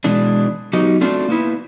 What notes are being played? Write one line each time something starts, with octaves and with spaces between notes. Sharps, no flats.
B2 E3 G#3 D4
F#3 B3 D#4 F#4 G4
A3 C4 D4 F4 F#4
A#3 B3 E4